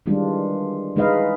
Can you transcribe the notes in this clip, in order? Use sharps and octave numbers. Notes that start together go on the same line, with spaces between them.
D#3 E3 G3 G#3 D4 F4
E3 G#3 D#4 B4 D#5 F5